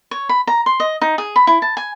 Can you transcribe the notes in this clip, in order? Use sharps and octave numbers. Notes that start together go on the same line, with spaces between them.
C#5
B5
A#5
C6
D#5
D#4
G#4
B5
E4
A5
G#5